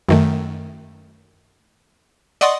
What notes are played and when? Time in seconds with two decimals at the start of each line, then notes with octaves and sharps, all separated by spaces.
0.09 F#2 D#3 A3
2.41 D5 D#5 F#5 C6 C#6 D#6